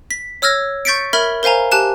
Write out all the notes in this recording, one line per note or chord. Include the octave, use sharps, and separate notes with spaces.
B6
C#5 E6 F6 G#6 A#6
C#6 G6 A6 B6 C#7 D7
A#4 E5 B5 F6 G#6 G7
A#4 C5 F5 G#5 A#5
G4 G#5 A5 F#6 E7